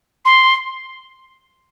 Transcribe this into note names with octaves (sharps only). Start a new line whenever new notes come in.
C6